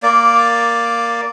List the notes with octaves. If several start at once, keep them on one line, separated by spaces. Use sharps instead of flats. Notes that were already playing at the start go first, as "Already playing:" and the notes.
A#3 D5